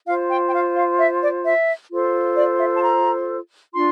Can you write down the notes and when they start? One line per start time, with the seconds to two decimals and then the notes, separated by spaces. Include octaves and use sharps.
0.06 F4 F5
0.09 C5
0.29 G5
0.48 G5
0.53 F5
0.76 F5
0.98 E5
1.22 D5
1.45 E5
1.91 F4 A4 C5
2.37 D5
2.60 E5
2.77 A5
2.83 A#5
3.74 D4 F4 C6